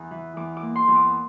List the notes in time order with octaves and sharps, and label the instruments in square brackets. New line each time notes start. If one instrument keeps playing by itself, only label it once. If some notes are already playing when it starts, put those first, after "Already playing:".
Already playing: [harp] E2 A#5
E3
E2 D6
D6
A#3
C6
E2
D6